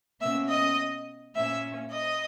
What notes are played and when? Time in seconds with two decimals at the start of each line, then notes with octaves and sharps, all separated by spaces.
0.21 B2 A#3 C#4 E5 E6
0.49 D#5 D#6
1.35 A#2 A#3 C#4 E5 E6
1.92 D#5 D#6